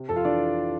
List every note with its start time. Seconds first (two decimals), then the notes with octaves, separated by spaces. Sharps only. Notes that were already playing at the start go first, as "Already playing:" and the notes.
Already playing: C3
0.08 F2 A4 A5
0.16 F4 F5
0.25 E3 D4 D5